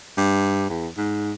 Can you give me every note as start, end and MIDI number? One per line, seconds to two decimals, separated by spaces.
0.18 0.68 43
0.70 0.88 40
0.98 1.32 44